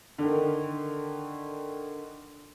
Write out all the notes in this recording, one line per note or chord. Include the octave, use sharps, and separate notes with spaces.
D3 D#3